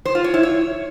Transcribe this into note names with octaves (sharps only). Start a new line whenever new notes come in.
C5
F4
C#5
E4
C#5